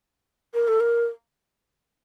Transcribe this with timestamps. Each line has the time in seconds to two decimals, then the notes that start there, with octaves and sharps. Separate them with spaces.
0.54 A#4
0.68 A4
0.80 A#4